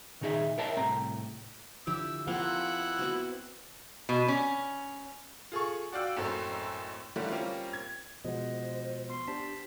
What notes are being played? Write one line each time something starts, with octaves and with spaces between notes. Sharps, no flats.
A#2 D#3 D#4 G#4 E5
A#4 C#5 D#5 E5 G5 A5
C2 A2 C4 G5 A#5
D3 F3 E4 G4 E6
F3 A#3 C4 E4 A4 F#5
B3 C4 F#4
B2
C#4
F4 G#4 A4 C#6
F#4 D5 F5 G5 E6
F#1 F#2 A2 C4 A4
D3 E3 G3 A3 A#3 C#4
G3 A#3 C4 C#4 F4
G#6
B2 F3 G#3 C5 D#5 F#5
B3 C6 C7
D4 G4 C5 A5 B6